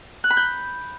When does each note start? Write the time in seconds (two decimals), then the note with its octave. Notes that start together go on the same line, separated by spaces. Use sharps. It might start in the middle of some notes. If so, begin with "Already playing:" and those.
0.24 F#6
0.30 B5
0.37 G6